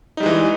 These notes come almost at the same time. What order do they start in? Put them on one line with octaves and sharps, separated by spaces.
D#4 G3 G#3 E3